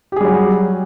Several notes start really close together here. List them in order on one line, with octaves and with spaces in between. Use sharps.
G4 G#4 G3 F#3